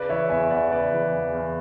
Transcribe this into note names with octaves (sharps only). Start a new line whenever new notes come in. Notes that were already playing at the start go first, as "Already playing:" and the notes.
Already playing: C#3 B4 D5
E3 C#5 E5
E2 E5 G#5
E2 D5 F#5
C#3 B4 D5
E3
E2
E2